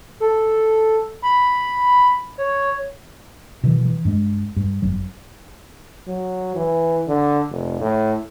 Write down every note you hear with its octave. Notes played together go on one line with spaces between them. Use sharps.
A4
B5
C#5
B2 D#3 E3 F#3
E3
G2 G#3
G2
G1 F#2 F#3
F#3
E3
D3
F1
A2